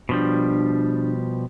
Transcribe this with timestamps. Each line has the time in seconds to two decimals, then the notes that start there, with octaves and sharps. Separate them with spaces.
0.09 B2 F3 G3 D4